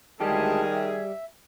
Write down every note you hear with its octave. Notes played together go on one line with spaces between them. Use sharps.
D2 D#3 G3 G#3 G4 G#4 A5
E5